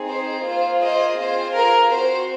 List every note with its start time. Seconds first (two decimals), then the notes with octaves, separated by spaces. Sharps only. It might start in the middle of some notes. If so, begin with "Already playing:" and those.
Already playing: C4 D#4 G#4
0.09 C5
0.46 A#3 F4 G#4 C5
0.82 C5 D#5
1.19 C4 F4 G#4 C5
1.56 A#4
1.91 C4 F#4 C5